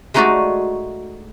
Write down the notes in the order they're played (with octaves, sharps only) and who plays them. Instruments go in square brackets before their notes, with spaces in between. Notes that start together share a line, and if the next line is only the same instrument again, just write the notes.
[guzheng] G#3 A3 D#4 F#4 A4 D5